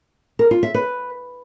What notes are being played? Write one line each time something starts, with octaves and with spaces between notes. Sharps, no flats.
A#4
F4
E5
B4